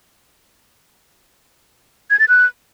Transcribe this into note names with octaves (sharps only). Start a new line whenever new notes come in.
G#6
A6
F#6